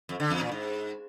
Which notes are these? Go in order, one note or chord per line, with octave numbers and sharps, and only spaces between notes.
F2
D3
E2
A#2
G#2